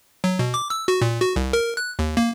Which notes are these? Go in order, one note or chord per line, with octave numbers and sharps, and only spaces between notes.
F#3
B2
D6
E6
F#4
A#2
F#4
C2
A#4
F#6
D#2
A#3